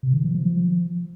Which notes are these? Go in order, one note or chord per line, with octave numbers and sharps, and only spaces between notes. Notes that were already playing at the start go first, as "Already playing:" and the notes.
C3
D#3
F3
F3
F3